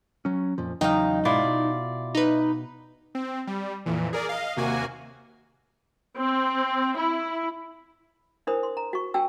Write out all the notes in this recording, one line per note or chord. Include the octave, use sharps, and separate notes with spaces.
F#3 C#4
F2 A#2 F3
E2 C#3 F#3 D#4 F5 G5
G#2 B2 G#3 E4 F4 D5
B2
D#4 B4
C4
G3
F2 A#2 E3
G#4 A#4 D5
D#5 F5
D#2 C3 A#3 F#4 G#5
C4
E4
D4 E4 A#4 C5 B5 D#6
C6
A#5
F#4 C#6
D4 F#4 G5 A5 E6